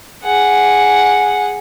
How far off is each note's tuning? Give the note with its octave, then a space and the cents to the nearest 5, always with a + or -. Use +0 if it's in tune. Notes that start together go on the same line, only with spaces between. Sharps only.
G#4 +0 F#5 -5